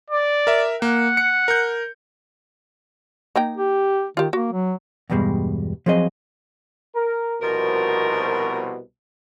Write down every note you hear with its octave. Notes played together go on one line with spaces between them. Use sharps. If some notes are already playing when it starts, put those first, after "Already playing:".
D5
A#4 E5
A#3 F#5
C#7
A#4 G6
A#3 D#4 G5
G4
D#3 F4 G4
A#3 F#4
F#3
E2 G2 B2 G3 G#3
F3 F#3 C4 G#4 D#5
A#4
C2 B2 F3 A#4